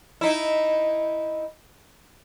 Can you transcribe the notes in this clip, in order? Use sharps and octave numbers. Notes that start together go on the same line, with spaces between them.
D#4 E4